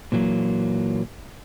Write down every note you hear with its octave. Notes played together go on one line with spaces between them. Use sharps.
A#2 E3 F#3 A#3